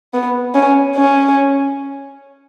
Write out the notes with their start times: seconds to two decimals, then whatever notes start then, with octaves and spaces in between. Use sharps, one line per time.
0.14 B3
0.54 C#4
0.96 C#4